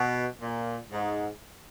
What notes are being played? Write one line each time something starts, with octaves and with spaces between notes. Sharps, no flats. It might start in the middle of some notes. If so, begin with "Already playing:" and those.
Already playing: B2
A#2
G#2